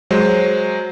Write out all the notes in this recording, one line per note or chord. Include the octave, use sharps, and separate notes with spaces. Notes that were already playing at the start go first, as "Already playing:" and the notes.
F#3 G#3 C5